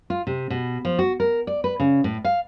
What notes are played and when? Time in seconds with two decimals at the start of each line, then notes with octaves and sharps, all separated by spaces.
0.10 F4
0.27 C3
0.50 B2
0.85 F3
0.99 F#4
1.20 A#4
1.47 D5
1.64 B4
1.80 C#3
2.04 A2
2.25 F5